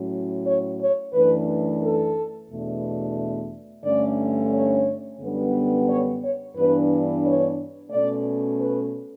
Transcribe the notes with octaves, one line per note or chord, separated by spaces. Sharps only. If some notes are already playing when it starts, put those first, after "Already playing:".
Already playing: A2 F#3 C#4
C#5
C#5
F#2 E3 A3 D4 B4
A4
E2 B2 A3 D4
G2 D3 A3 C#4 D5
C#5
F#2 D3 G3 B3 D4
C#5
C#5
G2 E3 B3 D4 B4
C#5
B2 A3 C#4 D5
B4